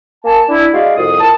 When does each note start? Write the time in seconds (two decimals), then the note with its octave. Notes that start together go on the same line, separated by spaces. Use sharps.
0.25 A#3 G#5 A5
0.49 D4 E4
0.73 G#3 F#4 G#4 D5 F5
0.97 C2 F2 D#6
1.20 A#2 A#4 A5